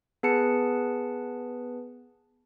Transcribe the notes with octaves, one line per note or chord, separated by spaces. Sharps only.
B3 G#4 B4 A5 C#7